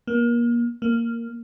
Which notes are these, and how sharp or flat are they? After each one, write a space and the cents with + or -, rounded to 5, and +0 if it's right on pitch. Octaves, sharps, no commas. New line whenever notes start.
A#3 +30
A#3 -10